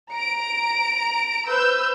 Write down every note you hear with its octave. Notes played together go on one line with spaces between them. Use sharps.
A#5 D7
B4 C5 E6 G6